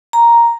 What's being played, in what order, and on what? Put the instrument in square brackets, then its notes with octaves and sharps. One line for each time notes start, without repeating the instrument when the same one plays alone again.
[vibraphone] A#5